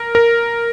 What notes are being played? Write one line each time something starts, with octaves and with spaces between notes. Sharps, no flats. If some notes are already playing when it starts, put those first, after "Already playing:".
Already playing: A#4
A#4